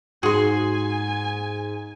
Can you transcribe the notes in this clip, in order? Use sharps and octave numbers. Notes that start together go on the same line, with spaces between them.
G#2 F#4 G#4 G#5 C6